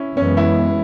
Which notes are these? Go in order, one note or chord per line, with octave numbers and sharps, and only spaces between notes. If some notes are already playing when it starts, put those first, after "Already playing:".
Already playing: C#4 E4
F#2 E3 G#3 B3 C#4
E4